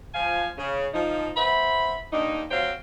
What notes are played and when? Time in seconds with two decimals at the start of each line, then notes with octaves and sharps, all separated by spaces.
0.14 F3 F5 G#5
0.58 C#3
0.94 F3 D#4
1.36 B3 C5 E5 B5
2.13 G2 A#3 D4 D#4
2.51 F#3 C4 C5 C#5 F5 G5